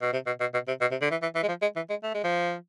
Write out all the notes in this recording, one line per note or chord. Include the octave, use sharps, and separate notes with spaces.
B2
C3
B2
B2
B2
C3
B2
C3
D3
E3
E3
E3
G#3
F3
G#3
E3
G#3
A3
G#3
F3